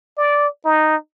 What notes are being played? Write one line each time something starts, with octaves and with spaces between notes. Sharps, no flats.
D5
D#4